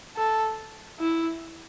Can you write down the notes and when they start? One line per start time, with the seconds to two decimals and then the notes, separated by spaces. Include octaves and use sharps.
0.17 A4
0.99 E4